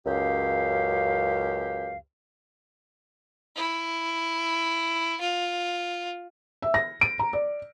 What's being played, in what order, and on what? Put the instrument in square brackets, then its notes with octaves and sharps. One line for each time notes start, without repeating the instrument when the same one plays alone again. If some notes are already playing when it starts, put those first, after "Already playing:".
[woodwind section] C#2 F#2 G4 F5
[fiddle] E4
F4
[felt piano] E5
A#6
D7
A#5
D5